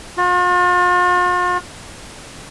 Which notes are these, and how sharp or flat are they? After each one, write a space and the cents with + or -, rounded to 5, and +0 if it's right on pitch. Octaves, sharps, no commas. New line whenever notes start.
F4 +45